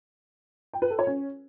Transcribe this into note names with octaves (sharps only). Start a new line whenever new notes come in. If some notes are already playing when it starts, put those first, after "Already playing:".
G5
B4
A4
C#5
C#4